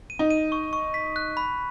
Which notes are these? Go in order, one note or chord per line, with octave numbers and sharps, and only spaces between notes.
D#7
D#4
D#7
C#6
C#6
B6
F#6
B5